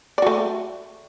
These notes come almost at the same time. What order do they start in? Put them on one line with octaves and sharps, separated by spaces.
D5 F#4 A3